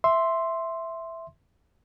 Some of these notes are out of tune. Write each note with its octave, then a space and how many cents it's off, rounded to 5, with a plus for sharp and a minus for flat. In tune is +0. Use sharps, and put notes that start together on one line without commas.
E5 +0 C6 +0